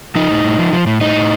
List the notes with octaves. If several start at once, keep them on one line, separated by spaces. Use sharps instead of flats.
F3 D#4
A2
A2
F3
F3
A2
A2 D#4
A2